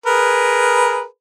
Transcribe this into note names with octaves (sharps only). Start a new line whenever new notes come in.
G#4 A#4 B4